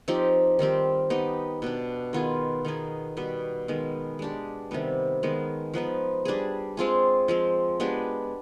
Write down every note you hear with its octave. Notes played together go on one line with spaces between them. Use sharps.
F3 C4 D#4 G4
D#3 G3 C4 G4
B3 D#4 G4
B2 B3 D4
D#3 B3 F4 G#4
D#3 B3 D#4 G#4
B2 G3 B3
D#3 G#3 B3
G#3 D4 G4
C3 D#3 G3 B3
D#3 G#3 B3
F3 B3 D#4 B4
G3 D4 G#4
G#3 C4 F4 G#4
F3 G#3 C4
G#3 B3 D4 G4